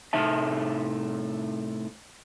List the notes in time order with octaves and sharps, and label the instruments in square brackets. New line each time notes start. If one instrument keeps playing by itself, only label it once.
[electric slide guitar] A2 C3 A3 D#4 E5 A5